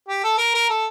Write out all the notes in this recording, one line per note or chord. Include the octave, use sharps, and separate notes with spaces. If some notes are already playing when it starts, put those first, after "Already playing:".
G4
A4
A#4
A#4
A4